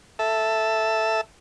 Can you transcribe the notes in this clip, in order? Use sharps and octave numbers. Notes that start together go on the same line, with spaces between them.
A4 E5